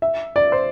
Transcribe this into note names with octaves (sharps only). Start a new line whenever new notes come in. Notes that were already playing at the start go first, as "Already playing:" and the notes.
E5
D5
C5